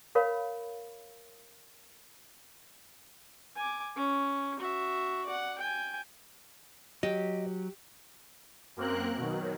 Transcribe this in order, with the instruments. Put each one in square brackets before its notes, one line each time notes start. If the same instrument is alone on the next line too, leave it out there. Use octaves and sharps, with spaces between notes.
[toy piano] A#4 C#5 F5 B5
[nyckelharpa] G#5 D6
C#4
F#4 E5
D5 F#5
G5 G#5
[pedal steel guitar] F#3 [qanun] G4 [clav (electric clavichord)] D#5
[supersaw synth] F#2 A#3 C4 A#4 F#6
B2 D#3 F#3